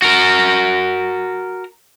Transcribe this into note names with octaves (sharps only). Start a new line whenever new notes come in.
F#4 A#4